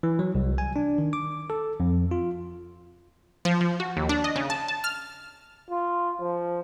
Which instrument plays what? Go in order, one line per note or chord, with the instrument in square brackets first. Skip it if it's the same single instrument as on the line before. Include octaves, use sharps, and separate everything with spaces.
[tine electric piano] E3
F#3
C2
G#5
D4
D#3
D6
A4
F2
F4
[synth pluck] F3
F3
F#4
D#2
D4
D#5
C#3
A5
A5
F6
[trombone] F4
F3